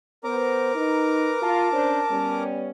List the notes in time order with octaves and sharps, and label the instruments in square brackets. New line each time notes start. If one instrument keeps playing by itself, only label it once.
[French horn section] B3 C5 [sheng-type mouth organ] A#4 A#5 D6
[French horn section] D#4 [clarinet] B4
[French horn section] F4 [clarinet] A5
[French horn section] C#4 D4 C5
G3 B3 C#4